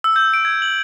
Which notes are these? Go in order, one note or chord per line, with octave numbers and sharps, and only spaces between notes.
E6
G6
D7
G#6
F#7